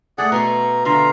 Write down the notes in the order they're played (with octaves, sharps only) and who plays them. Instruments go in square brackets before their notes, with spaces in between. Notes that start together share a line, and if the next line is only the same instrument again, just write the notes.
[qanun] A3 A4 [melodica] G#4 D5 F#5
[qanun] B2 C6 C#6 [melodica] A#5
[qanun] D3 E5 [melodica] F4 F5 A#5